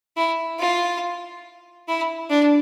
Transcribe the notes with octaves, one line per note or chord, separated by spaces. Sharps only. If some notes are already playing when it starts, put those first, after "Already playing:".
E4
F4
E4
D4